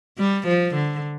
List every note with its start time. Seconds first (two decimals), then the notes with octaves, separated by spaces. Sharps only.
0.19 G3
0.48 F3
0.75 D3